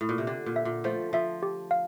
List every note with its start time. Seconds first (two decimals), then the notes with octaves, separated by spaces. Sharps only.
0.01 A2
0.09 A#2
0.18 C3
0.27 D3 G4
0.46 A#2
0.56 E5
0.65 A#2
0.84 F3 A3 C5
1.13 F3 E5
1.43 G4
1.71 F5